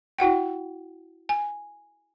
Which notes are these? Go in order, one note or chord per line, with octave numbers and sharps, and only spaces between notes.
E4 F#4 F#5 G5
G#5